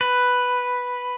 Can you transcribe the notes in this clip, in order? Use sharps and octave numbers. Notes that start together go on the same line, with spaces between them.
B4